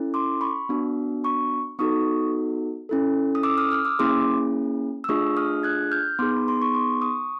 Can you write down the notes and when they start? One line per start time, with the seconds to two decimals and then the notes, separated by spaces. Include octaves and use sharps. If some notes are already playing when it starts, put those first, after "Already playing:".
Already playing: C#4 E4 A4
0.14 C6 D6
0.41 B5 C#6
0.69 B3 D4 F#4
1.24 B5 C#6
1.79 B3 D#4 F#4 A4 C#6 D#6
2.89 C#4 E4 A4
3.35 D#6
3.43 D6 E6
3.57 D#6 F6
3.71 D#6 F6
3.85 D6 E6
3.99 A#3 C#4 E4 G#4 C6 D6
5.04 E6
5.09 A3 D4 F4 G#4 C#6 D#6
5.37 D#6 F6
5.63 F#6 G#6
5.91 F6 G6
6.19 B3 D#4 G#4 C6 D6
6.36 B5
6.48 C6
6.62 C#6
6.74 C6 D6
7.01 C#6 D#6